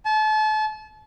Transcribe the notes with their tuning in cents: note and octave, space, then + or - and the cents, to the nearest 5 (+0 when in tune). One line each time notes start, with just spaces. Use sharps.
A5 -35